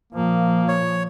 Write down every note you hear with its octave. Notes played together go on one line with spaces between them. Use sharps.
A#2 F3 A#3
C#5